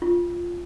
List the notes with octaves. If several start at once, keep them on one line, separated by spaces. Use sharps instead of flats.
F4